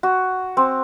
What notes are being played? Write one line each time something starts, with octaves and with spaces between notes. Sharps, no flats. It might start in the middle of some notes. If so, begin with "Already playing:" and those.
F#4
C4